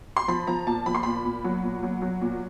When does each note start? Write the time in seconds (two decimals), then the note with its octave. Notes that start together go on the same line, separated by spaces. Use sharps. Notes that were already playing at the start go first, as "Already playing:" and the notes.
0.17 C6
0.28 F3 B5
0.47 F3 A#5
0.67 A#2 A5
0.86 F3 B5
0.95 C6
1.03 A#2 B5
1.25 A#2
1.44 F#3
1.63 A#2
1.83 F#3
2.02 F#3
2.21 A#2